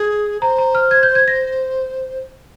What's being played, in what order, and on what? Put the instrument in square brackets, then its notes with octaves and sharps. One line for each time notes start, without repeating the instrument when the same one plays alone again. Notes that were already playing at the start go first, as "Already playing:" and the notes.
Already playing: [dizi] G#4 [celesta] G#6
[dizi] C5 [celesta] A#5
[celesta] A#5
F6
G#6
G6
G#6
A#6